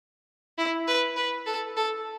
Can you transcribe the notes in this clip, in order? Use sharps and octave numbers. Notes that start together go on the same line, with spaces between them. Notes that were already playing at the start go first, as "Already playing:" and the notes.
E4
B4
B4
A4
A4